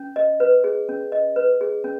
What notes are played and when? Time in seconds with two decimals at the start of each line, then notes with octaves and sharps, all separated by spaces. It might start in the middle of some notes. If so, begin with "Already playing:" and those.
Already playing: C#4
0.16 D#5
0.40 B4
0.64 G#4
0.89 C#4
1.12 D#5
1.36 B4
1.61 G#4
1.84 C#4